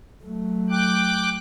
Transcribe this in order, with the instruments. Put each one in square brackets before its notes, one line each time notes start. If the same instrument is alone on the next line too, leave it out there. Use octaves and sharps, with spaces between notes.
[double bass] F#3 A3
[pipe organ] G5 D6 F#6